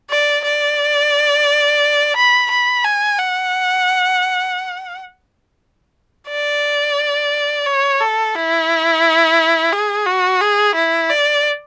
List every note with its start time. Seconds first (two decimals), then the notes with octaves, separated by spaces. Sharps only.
0.10 D5
0.44 D5
2.16 B5
2.51 B5
2.84 G#5
3.18 F#5
6.28 D5
7.66 C#5
8.00 A4
8.34 E4
9.72 G#4
10.06 F#4
10.41 G#4
10.75 E4
11.09 D5